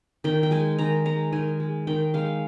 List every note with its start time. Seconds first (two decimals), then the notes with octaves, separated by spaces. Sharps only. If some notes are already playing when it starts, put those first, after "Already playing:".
0.24 D#3 G5
0.43 G5
0.51 G#3 G#5
0.78 D#3 A#5
1.05 G#3 A#5
1.32 D#3 G#5
1.60 G#3
1.87 D#3 G5
2.14 G#3 F5